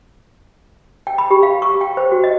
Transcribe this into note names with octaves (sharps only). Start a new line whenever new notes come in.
G5
B5
G4
F5
C#6
G5
C5
F#4
D#5